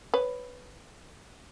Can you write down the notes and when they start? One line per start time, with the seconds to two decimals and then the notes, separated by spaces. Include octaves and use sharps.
0.14 B4 C#5